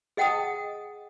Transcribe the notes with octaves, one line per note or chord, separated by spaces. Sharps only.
G#4 D#5 F#5 G5 A5 D#6